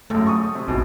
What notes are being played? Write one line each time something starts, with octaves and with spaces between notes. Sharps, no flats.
G#1 F#2 A3
C#6 D#6
C3
A#1 G#2 B2